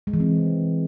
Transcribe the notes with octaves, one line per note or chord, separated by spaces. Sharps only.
G#3
E3
C4